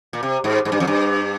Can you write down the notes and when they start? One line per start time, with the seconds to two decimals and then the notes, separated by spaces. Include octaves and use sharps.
0.13 A#2
0.23 C3
0.44 G#2
0.65 G#2
0.72 G2
0.80 F2
0.87 G2